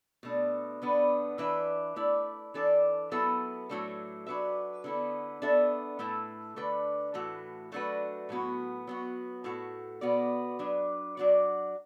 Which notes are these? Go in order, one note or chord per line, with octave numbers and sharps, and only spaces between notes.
B2 A3 D4
D3 B3 D4 B4
E3 D4 B4 E5
A3 E4 D5
E3 D4 A4 D5
F#3 B3 E4 A4 E5
A2 F#3 A3 D4 A4
F#3 D4 F#4 B4 E5
D3 B3 E4 A4
B3 D4 A4 E5
A2 A3 E4 A4
D3 A3 D4 B4 D5
A2 E3 A3 F#4
F#3 A3 D4 F#4 B4
A2 F#3 B3 F#4
F#3 B3 F#4
A2 A3 F#4
B2 B3 F#4 D5
F#3 D4 B4
F#3 D4 F#4 D5